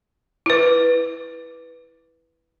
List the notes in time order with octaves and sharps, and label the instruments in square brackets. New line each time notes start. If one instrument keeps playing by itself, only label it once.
[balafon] E4 B4